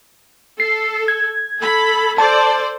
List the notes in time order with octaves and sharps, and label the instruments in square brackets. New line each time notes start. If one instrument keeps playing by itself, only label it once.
[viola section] A4 [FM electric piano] C7
[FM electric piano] G#6
[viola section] A4 B5
[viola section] A4 C5 D5 [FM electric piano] A5